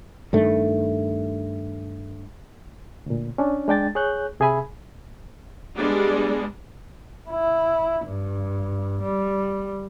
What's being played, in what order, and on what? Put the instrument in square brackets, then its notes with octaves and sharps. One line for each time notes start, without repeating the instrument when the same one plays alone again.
[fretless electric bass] G2 D#3 A3
[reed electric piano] D2 A#2
C#4 D4
G#3 D4 G5 A6
G#4 C#5 F#6 G6
C3 G#4 E5 G#5 B5
[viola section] G3 G#3 B3 D4
[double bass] E4
G2
G3